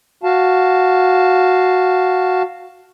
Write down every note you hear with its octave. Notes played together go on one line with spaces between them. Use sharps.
F#4 F5 A5